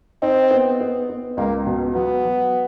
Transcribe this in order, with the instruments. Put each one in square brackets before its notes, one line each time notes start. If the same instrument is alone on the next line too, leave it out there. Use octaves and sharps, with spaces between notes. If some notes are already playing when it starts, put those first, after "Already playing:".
[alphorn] C4 [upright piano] D#4
[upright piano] B3
B3
B3
[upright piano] C#2 [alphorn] A#3
[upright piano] B2
[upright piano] F#3 [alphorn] B3
[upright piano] F#3